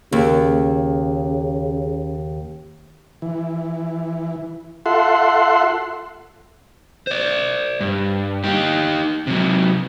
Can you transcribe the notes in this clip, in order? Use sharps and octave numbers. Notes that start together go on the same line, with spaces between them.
D#2 C#3
E3
F4 A4 E5 F#5 C6
C5 D5
G2
D#4 G4
C3 F#3